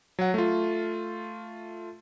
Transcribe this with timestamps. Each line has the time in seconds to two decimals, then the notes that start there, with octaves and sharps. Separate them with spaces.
0.19 F#3 F#5
0.34 A3 F4